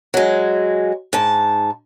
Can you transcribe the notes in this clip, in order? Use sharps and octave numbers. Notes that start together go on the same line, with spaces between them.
F#3 G#3
G#2 A5